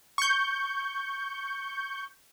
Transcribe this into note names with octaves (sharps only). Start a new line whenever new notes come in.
C#6 G6